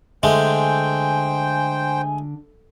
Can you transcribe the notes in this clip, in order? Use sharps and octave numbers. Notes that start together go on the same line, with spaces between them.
D3 G#3 A3 C5 G5 G#5